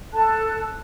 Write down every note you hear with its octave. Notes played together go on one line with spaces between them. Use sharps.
A4 A5 F#6